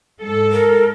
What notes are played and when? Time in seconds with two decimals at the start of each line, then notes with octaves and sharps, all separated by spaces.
0.21 G#2 A4
0.52 A#4